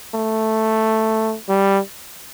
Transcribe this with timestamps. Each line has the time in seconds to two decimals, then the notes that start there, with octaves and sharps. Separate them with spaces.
0.15 A3
1.49 G3